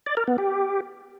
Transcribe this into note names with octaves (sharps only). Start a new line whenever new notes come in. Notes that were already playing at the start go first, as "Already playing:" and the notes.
D5
A#4
B3
G4